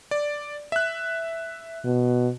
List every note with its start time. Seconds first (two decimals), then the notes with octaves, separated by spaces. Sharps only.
0.11 D5
0.72 E5 F#6
1.85 B2